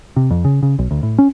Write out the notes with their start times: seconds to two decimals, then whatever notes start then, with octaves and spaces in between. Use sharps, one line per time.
0.16 C3
0.31 F2
0.45 C#3
0.63 C#3
0.79 B1
0.91 D2
1.03 A2
1.18 C#4